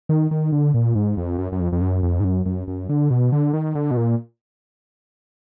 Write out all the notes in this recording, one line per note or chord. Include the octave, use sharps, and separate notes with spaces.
D#3
D#3
D3
A#2
G#2
F2
F#2
F#2
F2
F2
F#2
F2
G#2
F#2
F#2
F#2
D3
B2
D3
D#3
D3
B2
A#2